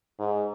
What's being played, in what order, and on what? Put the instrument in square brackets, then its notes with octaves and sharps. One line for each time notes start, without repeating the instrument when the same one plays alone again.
[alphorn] G#2